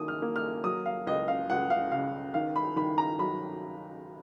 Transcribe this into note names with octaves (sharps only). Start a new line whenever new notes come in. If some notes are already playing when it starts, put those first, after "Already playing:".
Already playing: D#3 A#3 D#6
F6
A#3
F6
F#3 D#6
F5
C#2 D#5
F5
C#2 F#5
F5
C#3 F5
D#3 F5
B5
D#3 B5
A#5
F#3 B5